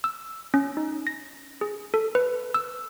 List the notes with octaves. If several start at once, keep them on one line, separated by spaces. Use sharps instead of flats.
E6
C#4
D#4
A#6
G#4
A4
B4
E6